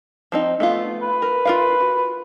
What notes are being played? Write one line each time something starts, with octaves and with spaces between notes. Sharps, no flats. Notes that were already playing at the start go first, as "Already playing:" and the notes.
F3 C4 D#4
A3 B3 F4
B4
A#4
F4 A#4 F5
F#4